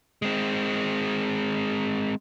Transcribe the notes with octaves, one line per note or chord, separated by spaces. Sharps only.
G#3 C4